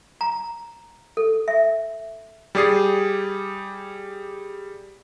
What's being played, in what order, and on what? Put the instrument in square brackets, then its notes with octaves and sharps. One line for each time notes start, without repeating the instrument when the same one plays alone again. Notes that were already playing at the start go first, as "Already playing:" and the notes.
[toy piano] A#5
A4
E5
[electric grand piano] G3 G4 G#4 D5 D#6 C7